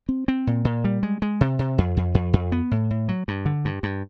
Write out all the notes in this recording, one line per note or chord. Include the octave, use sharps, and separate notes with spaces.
C4
C4
A#2
A#2
G3
G#3
G#3
C3
C3
F2
F2
F2
F2
B3
A2
A2
F#3
G2
D3
G2
G2